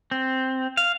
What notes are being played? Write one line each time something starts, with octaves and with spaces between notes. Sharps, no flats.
C4
F5